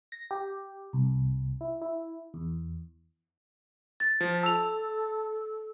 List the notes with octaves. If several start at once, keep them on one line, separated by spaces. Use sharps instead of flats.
A#6
G4
C2
E4
E4
E2
A6
F3
A4 A5 E6 F7